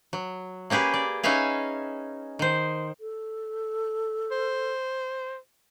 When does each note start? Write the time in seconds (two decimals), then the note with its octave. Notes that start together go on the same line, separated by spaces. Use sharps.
0.13 F#3
0.70 A#3 C#4 G4 G#4 B4
0.94 D5
1.23 C#4 D#4 B4 E5 F5 G#5
2.39 D#3 C5
3.00 A4
4.31 C5